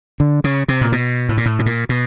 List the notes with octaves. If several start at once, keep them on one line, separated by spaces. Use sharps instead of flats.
D3
C#3
C3
A#2
B2
A2
A#2
A2
B2
A#2
B2